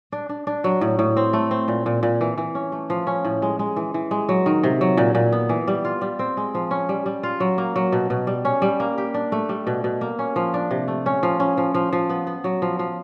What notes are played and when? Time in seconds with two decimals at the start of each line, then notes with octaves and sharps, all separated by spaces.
0.12 D4
0.29 D4
0.47 D4
0.64 F#3
0.81 A2
0.99 A2
1.17 C4
1.33 A3
1.51 C4
1.68 A#2
1.86 A#2
2.03 A#2
2.21 E3
2.38 E3
2.55 C#4
2.72 A3
2.90 F3
3.07 C#4
3.25 A2
3.42 G#3
3.59 G#3
3.76 E3
3.94 E3
4.11 G#3
4.29 F#3
4.46 D#3
4.63 C3
4.81 F#3
4.97 A#2
5.15 A#2
5.32 B3
5.49 E3
5.68 G3
5.85 F4
6.01 G3
6.19 C4
6.37 G#3
6.55 F3
6.71 C#4
6.89 G3
7.06 G3
7.23 F4
7.40 F#3
7.58 A#3
7.76 F#3
7.92 B2
8.10 B2
8.27 G3
8.45 C#4
8.62 G3
8.80 A#3
8.98 G4
9.14 D4
9.32 A3
9.49 G3
9.67 B2
9.84 B2
10.01 A#3
10.19 C#4
10.36 F3
10.54 D4
10.71 C3
10.88 A3
11.06 C#4
11.23 F3
11.40 C#4
11.57 F3
11.74 F3
11.93 F3
12.09 B3
12.27 B3
12.44 F#3
12.62 F3
12.79 F3